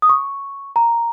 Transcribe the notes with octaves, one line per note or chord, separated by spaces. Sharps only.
D#6
C#6
A#5